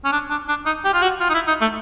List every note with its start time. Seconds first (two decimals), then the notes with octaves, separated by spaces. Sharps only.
0.05 C#4
0.12 D4
0.30 D4
0.49 D4
0.66 D#4
0.85 G4
0.94 F4
1.02 F#4
1.20 F4
1.29 D#4
1.34 E4
1.48 D#4
1.61 A3